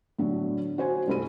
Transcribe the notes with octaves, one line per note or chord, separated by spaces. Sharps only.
A2 D3 F#3
F#4 C5 G#5
C2 G2 A3 C5 B5 D#7